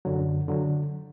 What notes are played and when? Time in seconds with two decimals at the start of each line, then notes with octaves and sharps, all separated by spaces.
0.05 F#2 D3 F#3
0.48 D3 F#3